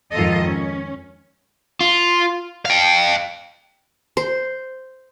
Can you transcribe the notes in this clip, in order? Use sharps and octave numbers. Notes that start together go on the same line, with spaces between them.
F2 G#2 D#3 F4 A4 D#5
C#4
F4
F5 G5
C5